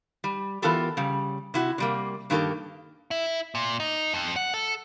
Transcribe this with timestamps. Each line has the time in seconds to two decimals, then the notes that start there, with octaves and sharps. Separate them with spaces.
0.24 G3
0.62 E3 B3 F4 G4 A4 A#4
0.97 C#3 G3
1.54 C3 E4 F#4
1.78 C3 G3 A#3
2.30 G2 D#3 A#3 B3 G4 A4
3.11 E4
3.55 A#2
3.80 D#4
4.14 F2
4.36 F#5
4.54 A4